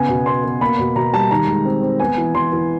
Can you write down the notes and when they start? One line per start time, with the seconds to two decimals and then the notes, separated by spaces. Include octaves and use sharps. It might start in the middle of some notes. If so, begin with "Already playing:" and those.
Already playing: C#3 B3 G#5
0.09 B2
0.26 B3 C6
0.44 B3
0.61 A#3 B5
0.79 B2
0.96 B2 A#5
1.13 G3 A5
1.31 D#3 A#5
1.47 G#3
1.65 C4
1.83 C4
2.00 B3 G#5
2.17 E3
2.34 E3 C6
2.52 E3